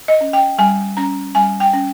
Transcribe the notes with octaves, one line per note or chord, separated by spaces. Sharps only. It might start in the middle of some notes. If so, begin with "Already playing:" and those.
D#5
C#4
G5
G3 G#5
C#4 A#5
G3 G#5
G5
C#4